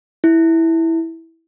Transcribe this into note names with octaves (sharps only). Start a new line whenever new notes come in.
E4